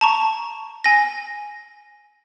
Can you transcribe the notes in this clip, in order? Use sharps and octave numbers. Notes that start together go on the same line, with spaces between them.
A5 A#5 C#6
G#5 A#6